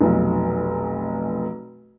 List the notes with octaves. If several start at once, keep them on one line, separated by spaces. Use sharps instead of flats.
F1 B1